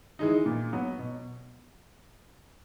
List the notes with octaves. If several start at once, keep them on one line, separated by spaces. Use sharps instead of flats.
E3 G#3 D#4
A#2
F#3 B3
B2